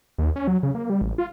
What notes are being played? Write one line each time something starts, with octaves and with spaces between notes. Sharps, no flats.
D#2
C#4
F#3
C#3
A#3
G3
A1
F4